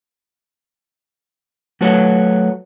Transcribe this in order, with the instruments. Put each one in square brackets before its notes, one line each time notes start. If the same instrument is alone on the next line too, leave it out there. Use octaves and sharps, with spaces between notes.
[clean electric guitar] F#3 A3 F#4 B4 C#5